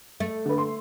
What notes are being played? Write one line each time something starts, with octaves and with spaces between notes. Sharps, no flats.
A3
D3 B4
C6